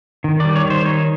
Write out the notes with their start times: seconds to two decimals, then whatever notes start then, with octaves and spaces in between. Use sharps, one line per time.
0.24 D#3
0.40 G3 D5
0.56 C#5
0.65 D#3
0.70 C5
0.85 D#4 C#5